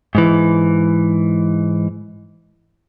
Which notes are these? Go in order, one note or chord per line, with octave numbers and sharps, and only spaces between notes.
G#2 E3